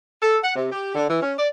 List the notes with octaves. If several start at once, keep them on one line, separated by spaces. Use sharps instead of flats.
A4
F#5
C3
G4
D3
E3
C#4
D5